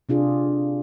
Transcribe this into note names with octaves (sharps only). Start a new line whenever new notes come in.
C3 D4 F4 G#4